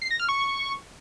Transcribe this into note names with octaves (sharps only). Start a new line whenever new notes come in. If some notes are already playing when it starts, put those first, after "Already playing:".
C7
A#6
F6
C#6